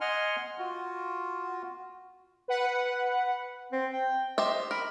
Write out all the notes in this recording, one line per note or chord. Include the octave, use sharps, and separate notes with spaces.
D#5 F#5 G#5 C6 F6
F4 F#4
B4 F#5
C4
G5
G4 C5 D#5 E5
A#4 B5